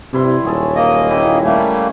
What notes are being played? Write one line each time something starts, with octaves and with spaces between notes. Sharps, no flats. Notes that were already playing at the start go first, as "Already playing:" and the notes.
G2 C3 E4 C6
D#1 F#3 G#4 A4
A#3 D#5
C#3 E4 G5
G3 A3 A#3 G#5